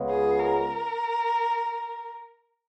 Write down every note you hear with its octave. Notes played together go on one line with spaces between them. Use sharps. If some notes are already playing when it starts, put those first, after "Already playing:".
Already playing: C#2 C#3 G#3 B3
G#4
A#4